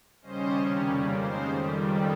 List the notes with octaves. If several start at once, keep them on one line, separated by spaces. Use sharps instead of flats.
D#2 C#3 G3 C#4 C5 D#5
C3 D#3 G3 C#4
F2 C#3 G3 A#3 C#5
C#3 G#3 D#4 C5
F2 D#3 G3